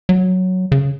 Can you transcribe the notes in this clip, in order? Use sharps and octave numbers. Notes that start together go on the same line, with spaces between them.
F#3
C#3